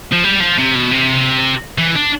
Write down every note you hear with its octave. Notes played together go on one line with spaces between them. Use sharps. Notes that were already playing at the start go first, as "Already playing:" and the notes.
F3
G3
F3
C3
B2
C3
E3
D4